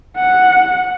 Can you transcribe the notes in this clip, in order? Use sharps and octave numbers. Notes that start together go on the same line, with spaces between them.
F#5